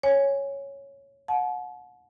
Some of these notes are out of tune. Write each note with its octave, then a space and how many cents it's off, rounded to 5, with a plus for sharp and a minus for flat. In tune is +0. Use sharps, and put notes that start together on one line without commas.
C#5 +0 G#5 +0
F#5 -25 A5 -40